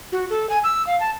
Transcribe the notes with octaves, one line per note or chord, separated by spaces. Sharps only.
F#4
A4
G#5
E6
F5
A5